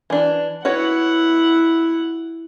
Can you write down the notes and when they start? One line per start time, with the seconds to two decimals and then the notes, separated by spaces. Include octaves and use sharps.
0.10 E3 D4
0.65 E4 F#4 B4 C#5 F#5